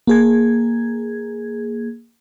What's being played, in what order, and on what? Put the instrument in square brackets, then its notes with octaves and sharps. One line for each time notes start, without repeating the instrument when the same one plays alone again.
[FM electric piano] A#3 G#4 G#6